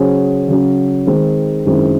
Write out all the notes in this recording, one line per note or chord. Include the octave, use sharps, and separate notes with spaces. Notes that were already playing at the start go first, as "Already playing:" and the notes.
Already playing: C#3 F#3 C#4 G#4 C5
C#3 F#3 C#4
D#3 G#3 C4
F#2 D#3 G#3 C4 E4